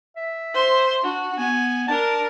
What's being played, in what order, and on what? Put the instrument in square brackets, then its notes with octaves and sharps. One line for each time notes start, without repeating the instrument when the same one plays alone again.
[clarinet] E5
[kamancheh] C5 C6
[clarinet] D4 [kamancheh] F#4
[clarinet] B3 [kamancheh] G#5
[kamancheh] D4 A#4 [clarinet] A5